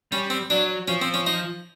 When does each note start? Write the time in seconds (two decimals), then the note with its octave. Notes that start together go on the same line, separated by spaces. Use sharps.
0.12 G3 C#4
0.30 C4
0.50 F#3 D4
0.88 F3 C#4
1.02 C4
1.14 C#4
1.27 D#4